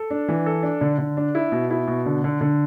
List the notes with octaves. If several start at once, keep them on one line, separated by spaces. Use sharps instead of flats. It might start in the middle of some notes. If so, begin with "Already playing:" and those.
Already playing: A4
D4
E3
A4
D4
D3
D3
D4
E4
B2
E4
B2
D3
D3
D3